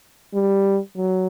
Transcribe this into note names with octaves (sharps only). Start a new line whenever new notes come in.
G3
F#3